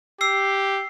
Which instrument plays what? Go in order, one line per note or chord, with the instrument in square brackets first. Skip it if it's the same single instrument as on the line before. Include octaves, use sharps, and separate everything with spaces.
[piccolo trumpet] G4 [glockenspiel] E6 C7